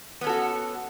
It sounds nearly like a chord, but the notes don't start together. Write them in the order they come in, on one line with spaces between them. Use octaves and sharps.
B3 C#4 A4 F#4